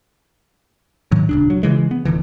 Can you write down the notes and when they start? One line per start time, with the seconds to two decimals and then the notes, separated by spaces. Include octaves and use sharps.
1.11 G#2 D#3 F#3
1.29 D#1 C#2 D4
1.50 F#3
1.63 C#3 E3 G#3
1.91 B3
2.05 D1 D3 E3